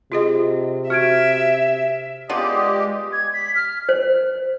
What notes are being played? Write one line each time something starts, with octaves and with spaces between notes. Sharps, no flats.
C3 F4 G#4 D#5
F#4 E5 F6 G#6 D7
G#3 B3 F4 G4 D5 D#5
G#6
B6
F6
C5